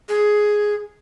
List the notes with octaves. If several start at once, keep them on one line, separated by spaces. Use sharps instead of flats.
G#4